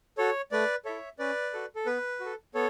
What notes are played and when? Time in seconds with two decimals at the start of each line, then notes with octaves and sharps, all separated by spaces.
0.18 F#4 A4 C#5
0.51 A3 B4 D5
0.85 E4 A4 C#5 E5
1.19 C#4 B4 D5
1.53 F#4 A4
1.75 A4
1.86 B3 B4
2.20 F#4
2.25 A4
2.55 B3 A4 C#5